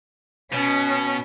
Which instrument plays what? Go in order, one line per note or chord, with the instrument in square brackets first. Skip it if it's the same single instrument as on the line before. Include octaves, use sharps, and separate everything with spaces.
[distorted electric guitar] B2 [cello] C#4